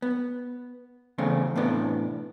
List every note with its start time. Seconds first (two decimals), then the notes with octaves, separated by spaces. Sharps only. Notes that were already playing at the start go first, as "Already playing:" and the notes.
0.02 B3
1.18 E2 C#3 A3 C4
1.56 A2 C3 E3 B3 D4